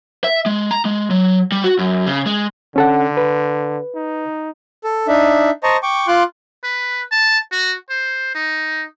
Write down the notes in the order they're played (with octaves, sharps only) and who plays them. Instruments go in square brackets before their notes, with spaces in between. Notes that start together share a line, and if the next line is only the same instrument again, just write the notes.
[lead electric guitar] E5
G#3
A#5
G#3
F#3
G3
F#4
F#2
C#3
G#3
[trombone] D3 [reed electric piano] C#4 A4 F#5
[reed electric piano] B4
[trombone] D#4
[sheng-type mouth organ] A4
D4 D#4 E5
C5 D#5 A5 A#5 C#6
G5 C#6 D6
F4 C6 D6 F#6
[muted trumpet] B4
A5
F#4
C5
D#4